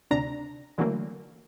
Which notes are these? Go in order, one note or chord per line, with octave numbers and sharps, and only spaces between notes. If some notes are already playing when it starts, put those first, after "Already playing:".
D2 C3 D4 A#5
D3 E3 F#3 A3 A#3